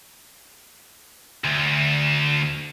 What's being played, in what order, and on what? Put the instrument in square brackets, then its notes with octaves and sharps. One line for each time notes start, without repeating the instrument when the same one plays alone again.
[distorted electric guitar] D2